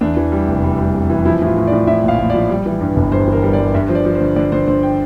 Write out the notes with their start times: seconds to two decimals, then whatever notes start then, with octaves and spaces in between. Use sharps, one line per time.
0.01 E2 D4
0.17 E3
0.32 G3
0.48 F1
0.63 G3
0.79 G3
0.94 F1
1.10 E3
1.25 F3 E4
1.41 A2 F4
1.57 A2
1.67 D5
1.72 A2
1.87 A2 E5
2.04 A#1 F5
2.19 A#1
2.30 F3 D5
2.49 G3
2.66 E3
2.81 G2
2.96 G1
3.12 G2 C5
3.28 E3 A#4
3.43 G3
3.53 D5
3.59 G3
3.74 G2 E5
3.88 F3 C5
3.95 D5
4.05 F3
4.15 C5
4.20 D3
4.36 D3 D5
4.52 D3 C5
4.67 D3 C5
4.83 G5